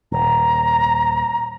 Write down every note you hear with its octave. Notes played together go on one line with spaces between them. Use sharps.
D#1 A#5